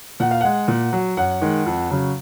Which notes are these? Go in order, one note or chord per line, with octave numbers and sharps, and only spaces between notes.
A#2 F#5
F5
G#3 F#5
A#2
F#3
F#2 F#5
D#3 G#3
F2
C#3 F#3